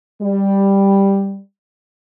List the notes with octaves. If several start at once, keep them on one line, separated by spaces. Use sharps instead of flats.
G3